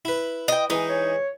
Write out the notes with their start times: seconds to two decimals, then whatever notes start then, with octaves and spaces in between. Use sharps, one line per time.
0.05 E4 B4
0.48 D#5 G5
0.70 E3 G#3 D#4
0.89 C#5